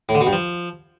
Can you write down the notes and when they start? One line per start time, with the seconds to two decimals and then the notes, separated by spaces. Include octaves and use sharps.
0.09 A2
0.15 D3
0.21 B2
0.27 G2
0.33 F3